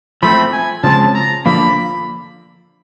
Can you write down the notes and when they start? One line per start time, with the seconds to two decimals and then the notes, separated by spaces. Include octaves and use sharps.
0.23 F3 A3 C4 B5
0.53 G#5
0.84 C#3 F3 G#3 C4 A5
1.15 A#5
1.46 D3 F3 A#3 B5